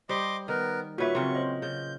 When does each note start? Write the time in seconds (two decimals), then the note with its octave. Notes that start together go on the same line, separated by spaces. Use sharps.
0.09 G3 C5 D#5 C6 D6
0.48 D#3 B3 A#4
0.98 A#2 F#4 B4 C#5 E5 C#6
1.15 C#3 F#3 C4 C6
1.35 F4 C5 D#5
1.62 C#3 G6